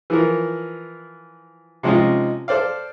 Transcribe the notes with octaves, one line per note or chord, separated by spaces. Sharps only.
E3 F3 A#4
C3 F3 G#3 C#4 D#4 F4
A4 C5 D5 F5